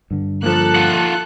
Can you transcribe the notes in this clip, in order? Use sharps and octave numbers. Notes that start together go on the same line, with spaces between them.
G2 D3
F3 A#3 A4 F#6
F4 F#5